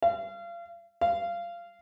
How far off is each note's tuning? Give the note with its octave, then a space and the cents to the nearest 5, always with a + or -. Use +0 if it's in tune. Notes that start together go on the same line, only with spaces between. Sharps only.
F5 -35
F5 -20